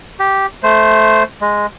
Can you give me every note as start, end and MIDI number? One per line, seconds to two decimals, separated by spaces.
0.19 0.46 67
0.63 1.23 57
0.63 1.23 72
1.41 1.66 56